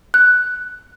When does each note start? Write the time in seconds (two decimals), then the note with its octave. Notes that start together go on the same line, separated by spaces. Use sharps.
0.14 F#6